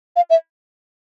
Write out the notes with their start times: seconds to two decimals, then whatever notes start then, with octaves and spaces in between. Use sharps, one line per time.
0.16 F5
0.30 E5